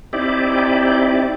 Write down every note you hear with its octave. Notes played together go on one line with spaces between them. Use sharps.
C4 D#4 E4 G4 D5